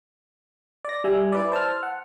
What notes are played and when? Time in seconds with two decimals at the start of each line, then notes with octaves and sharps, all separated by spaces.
0.85 D5 A#6
1.04 G3 E5 G#5
1.32 E4 B4 D5
1.52 C5 A5 E6 F6
1.83 F#5